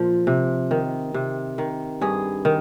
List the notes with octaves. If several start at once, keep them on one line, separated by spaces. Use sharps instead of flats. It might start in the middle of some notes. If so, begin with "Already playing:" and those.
Already playing: A#2 F3
C3
D#3
C3
D#3
G2 G#4
D#3